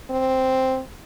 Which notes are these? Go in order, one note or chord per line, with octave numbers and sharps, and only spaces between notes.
C4